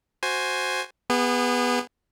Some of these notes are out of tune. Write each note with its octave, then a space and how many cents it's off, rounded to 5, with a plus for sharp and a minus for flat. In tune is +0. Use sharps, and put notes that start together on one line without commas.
F#4 +0 C5 +0 G#5 +0
B3 -5 G#4 -35